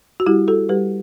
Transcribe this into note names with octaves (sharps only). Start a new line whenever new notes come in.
F#4
G3 E4 G4
F#4 A4
G3 G4 B4